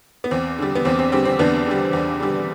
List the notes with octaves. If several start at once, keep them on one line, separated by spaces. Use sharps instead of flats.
B3
E2 C4
D3 G3
B3
E2 C4
C4
D3 G3 C4
C4
E2 B3 D4
D3 G3
E2
D3 G3